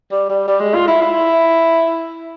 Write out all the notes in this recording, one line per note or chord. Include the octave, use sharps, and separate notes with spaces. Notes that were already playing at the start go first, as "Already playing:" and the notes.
G3
G3
G3
G#3
F4
E4
E4